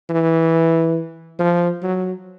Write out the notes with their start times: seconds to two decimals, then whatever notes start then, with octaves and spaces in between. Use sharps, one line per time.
0.10 E3
1.39 F3
1.82 F#3